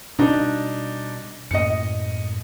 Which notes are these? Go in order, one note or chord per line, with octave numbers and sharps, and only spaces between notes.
B2 G3 D4 D#4
F#2 A2 A#3 D#5 C#7